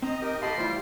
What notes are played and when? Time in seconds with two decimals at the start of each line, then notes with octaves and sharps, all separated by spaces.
0.02 C4 D#5 A#5
0.21 D#4 G4 A#4 G5
0.42 G4 A4 F5 A5 B5 C6
0.58 E3 G3 A3 E4 F4 C5